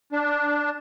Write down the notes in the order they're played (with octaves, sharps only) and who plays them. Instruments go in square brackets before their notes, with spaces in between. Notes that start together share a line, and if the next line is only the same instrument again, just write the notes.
[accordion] D4